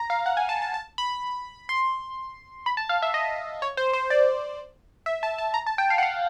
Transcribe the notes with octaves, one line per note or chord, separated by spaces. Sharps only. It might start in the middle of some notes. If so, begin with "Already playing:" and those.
Already playing: A#5
F5
F#5
G#5
A5
A5
A5
B5
C6
B5
A5
F5
E5
D#5
C#5
C5
C5
D5
E5
A5
A5
A#5
A5
G5
F5
F#5
F5